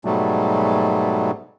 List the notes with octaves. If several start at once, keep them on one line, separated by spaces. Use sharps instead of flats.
G#2 B2 F#3 G3 A3